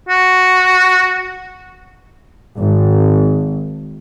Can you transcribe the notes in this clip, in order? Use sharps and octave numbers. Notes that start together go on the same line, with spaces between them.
F#4
G#1